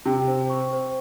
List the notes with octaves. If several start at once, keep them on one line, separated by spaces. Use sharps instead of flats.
C3 G5
C5
C#6
C5